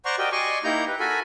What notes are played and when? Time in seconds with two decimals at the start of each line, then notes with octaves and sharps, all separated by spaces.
0.05 C5 D5 F#5 A#5 C6 C#6
0.18 F#4 G4 A#4 D5 D#5 G5
0.32 D5 D#5 G#5 C6 C#6
0.64 A#3 D#4 E4 G4 A#5 G6
0.88 B4
1.00 F#4 A4 A#4 G#5 B5